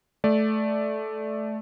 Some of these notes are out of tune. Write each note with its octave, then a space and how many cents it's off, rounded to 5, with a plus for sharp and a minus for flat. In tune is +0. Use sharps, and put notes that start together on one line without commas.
A3 -15 D5 +0